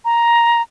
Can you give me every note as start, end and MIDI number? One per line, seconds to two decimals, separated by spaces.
0.05 0.62 82